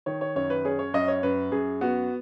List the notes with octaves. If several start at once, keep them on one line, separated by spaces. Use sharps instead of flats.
D#3 C#5
C#5
F#2 C#5
B4
C#4 G#4
C#5
F#2 D#5
C#5
F#2 B4
F#2 G#4
B3 F#4